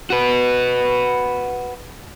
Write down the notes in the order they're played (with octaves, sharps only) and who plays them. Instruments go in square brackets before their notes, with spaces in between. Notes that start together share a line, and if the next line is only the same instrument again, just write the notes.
[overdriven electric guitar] F#4 B4